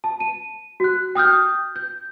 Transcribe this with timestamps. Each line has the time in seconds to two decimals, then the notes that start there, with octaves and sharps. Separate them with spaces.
0.04 A5
0.20 D#7
0.80 F#4 F#6
1.15 G5 D#6 F6 G6
1.76 G6